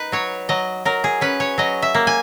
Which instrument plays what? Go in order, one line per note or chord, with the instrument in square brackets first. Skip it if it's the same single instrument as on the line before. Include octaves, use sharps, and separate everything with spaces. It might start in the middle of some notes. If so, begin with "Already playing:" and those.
Already playing: [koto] D#4 B4
F#3 C#5
F#3 D#5
F#3 A#4
G#4
C#4 B4
C#5
F#3 D#5
E5
A#3
G#5